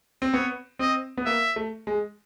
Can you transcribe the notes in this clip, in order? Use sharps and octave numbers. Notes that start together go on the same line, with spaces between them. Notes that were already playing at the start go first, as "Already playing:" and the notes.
C4
B3 C#5
C4 D#5
B3
A#3 E5
A3
G#3